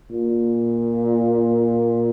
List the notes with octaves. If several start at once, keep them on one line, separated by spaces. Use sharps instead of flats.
A#2